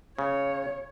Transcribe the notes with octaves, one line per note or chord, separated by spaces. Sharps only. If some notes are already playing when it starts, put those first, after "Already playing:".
C#3 C#5